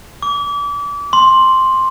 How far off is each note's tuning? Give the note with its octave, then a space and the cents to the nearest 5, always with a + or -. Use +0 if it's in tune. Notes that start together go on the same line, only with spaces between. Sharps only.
D6 -35
C6 +5